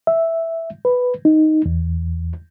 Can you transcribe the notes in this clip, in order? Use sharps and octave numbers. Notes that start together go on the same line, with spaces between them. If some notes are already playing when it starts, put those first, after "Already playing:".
E5
B4
D#4
E2